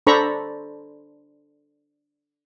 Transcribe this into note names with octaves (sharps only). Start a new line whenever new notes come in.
D4 A4 C5 A#5 B5 C#6